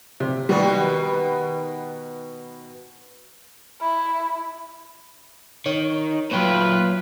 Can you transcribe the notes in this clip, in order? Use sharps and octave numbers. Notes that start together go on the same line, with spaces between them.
C3
B2 D#3 G3 B3
E4
D#3 C#5
A#2 F#3 F4 B4 C#5 G5